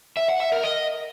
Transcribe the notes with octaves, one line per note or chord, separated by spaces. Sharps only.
E5
F#5
E5
A#4
D#5